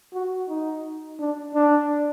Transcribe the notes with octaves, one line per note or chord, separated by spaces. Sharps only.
F#4
D#4
D4
D4